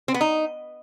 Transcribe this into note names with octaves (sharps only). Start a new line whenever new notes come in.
C4
B3
D#4